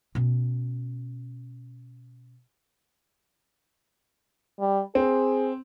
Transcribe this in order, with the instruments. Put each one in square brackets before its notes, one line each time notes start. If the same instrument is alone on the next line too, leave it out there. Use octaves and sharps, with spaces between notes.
[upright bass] B2 C#4
[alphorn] G3
[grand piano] C4 [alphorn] G#4